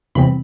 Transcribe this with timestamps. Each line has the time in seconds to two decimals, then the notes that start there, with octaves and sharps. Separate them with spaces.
0.15 E2 C3 E3 G3 C4 B5